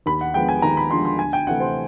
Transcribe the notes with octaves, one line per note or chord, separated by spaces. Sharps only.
D#2 B5
F#5
D3 F3 G#3 B3 G5
G#5
D#2 A#5
B5
D3 F3 G#3 B3 C6
C6
D2 G#5
G5
C3 E3 A3 F#5
C5